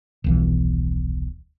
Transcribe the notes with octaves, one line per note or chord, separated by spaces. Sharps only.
D#1 B1 E3